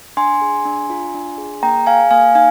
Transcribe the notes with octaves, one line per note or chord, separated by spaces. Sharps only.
D4 G#5 C6
G#4
D4
F4
D4
G#4
A#3 G5 A#5
G#4 F5 G#5
A#3 F5 G#5
D#4 F5 G#5